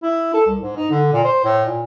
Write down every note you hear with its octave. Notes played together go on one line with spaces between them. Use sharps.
E4
A4
C2
G#2
D#4
D3
A#2
C5
A2
A#2